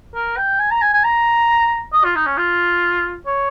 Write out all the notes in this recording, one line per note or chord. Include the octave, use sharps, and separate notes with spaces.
A#4
G5
G#5
A#5
G#5
G#5
A#5
D#5
F4
D#4
C#4
F4
C#5